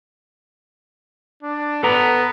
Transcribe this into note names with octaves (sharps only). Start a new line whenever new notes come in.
D4
B3 A4 B4 A#5